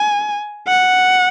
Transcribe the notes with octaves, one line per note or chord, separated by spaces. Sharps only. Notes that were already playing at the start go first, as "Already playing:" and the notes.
Already playing: G#5
F#5